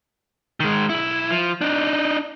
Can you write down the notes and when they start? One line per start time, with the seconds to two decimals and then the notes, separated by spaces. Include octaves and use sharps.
0.60 D#3 G#3
0.89 B1 E4
1.30 F3
1.61 D4 D#4